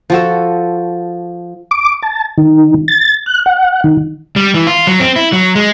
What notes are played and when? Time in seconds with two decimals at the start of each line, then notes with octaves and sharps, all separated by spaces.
0.10 F3 F#4 A4
1.71 D6
2.03 A5
2.38 D#3
2.88 A6
3.26 F#6
3.46 F#5
3.84 D#3
4.36 G3
4.54 E3
4.67 F4
4.87 F#3
5.00 C4
5.16 E4
5.32 F#3
5.55 G#3